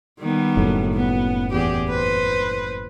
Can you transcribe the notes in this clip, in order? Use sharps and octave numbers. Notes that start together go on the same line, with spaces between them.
D#3 G3 B3
F#1 F#2 A2
B3
E2 G4 G#4
B4 C5